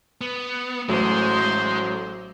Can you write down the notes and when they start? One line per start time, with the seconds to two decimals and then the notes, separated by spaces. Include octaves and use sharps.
0.21 B3
0.89 A1 F#3 G#3 A3 C5